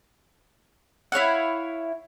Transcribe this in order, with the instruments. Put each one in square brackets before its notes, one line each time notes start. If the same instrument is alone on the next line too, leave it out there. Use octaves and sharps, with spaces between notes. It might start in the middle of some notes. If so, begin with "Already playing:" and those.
[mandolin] E4 C#5 F5 F#5